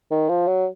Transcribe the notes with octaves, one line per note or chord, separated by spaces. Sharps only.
D#3
F3
F#3